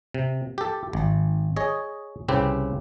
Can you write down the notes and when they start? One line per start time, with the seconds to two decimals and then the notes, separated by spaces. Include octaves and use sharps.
0.14 C3
0.58 G4 A4
0.93 G#1
1.56 G#4 C#5 D#5
2.28 C2 C#3 C4 G4 B4